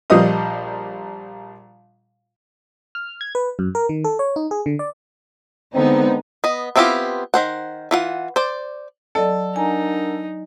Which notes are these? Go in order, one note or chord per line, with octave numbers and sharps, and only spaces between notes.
A#1 F3 G3 C5 D#5 D#6
F6
G#6
B4
F#2
A#4
D#3
A4
C#5
D#4
G#4
D3
D5
D3 G#3 B3 C4 D#4
B3 D#5
B3 C4 E4 F4 G4
D#3 C5 F#5
E3 F4 F#5
C5 D5
F#3 A4 D5 D#5
D4 D#4 A#4 F#5 G#5 A#5